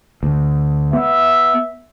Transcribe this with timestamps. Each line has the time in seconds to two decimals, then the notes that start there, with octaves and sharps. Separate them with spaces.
0.23 D2
0.93 B3 E5